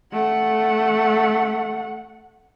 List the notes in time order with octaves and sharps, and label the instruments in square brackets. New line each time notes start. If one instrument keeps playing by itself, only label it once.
[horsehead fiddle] A3 F#5